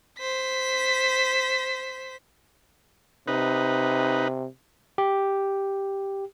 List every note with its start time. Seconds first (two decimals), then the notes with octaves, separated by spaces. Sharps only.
0.19 C5 B6
3.28 C3 D#4 B4
4.98 G4